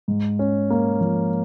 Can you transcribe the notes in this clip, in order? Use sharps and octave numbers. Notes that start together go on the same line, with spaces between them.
G#2
C#4
A#3
F3